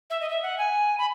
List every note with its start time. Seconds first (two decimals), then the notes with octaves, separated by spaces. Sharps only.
0.10 E5
0.21 D#5
0.30 E5
0.43 F#5
0.58 G#5
0.98 B5